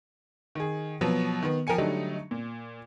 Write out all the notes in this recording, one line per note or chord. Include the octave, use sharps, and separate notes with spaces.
D#3 G#4
B2 F3 F#3 B3
D#3 B3
F3 A#4 G5 G#5 C#7
D3 F#3 G3 A3 D#4
A#2